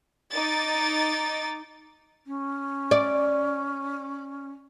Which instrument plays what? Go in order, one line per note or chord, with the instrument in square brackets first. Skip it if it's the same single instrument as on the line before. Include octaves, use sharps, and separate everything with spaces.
[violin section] D#4 D6 A6
[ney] C#4
[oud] D5